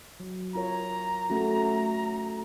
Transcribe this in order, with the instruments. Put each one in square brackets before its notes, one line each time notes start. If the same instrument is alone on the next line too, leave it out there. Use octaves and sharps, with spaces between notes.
[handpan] F#3
[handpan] F4 A#4 C#5 [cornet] A#5
[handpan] A3 C#4 F#4